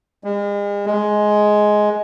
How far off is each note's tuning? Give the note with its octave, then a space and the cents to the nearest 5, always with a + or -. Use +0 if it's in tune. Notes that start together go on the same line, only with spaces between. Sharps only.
G#3 -40
G#3 +10